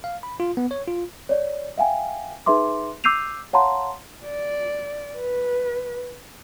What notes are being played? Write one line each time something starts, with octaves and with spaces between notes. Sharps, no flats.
F5
B5
F4
B3
C#5
F4
C#5 D5
E5 F5 G5 G#5
D#4 G#4 B4 E5 C6 D6
D6 E6 G6 C7 D#7 F7
C#5 F5 F#5 A5 A#5 C6
D5
B4